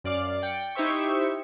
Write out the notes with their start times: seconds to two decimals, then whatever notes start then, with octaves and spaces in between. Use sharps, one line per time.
0.04 F#2 D5 F5 D6
0.42 D5 G5 C#7
0.75 D#4 E4 G4 C5 E5 C#6